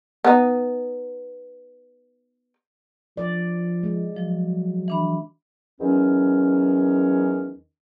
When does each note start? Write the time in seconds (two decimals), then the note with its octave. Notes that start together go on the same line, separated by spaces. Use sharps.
0.25 B3 D#4
3.17 F3 D5
3.83 G#3
4.16 F3 F#3
4.88 E3 D4 B5
5.81 E2 D#3 F#3 C#4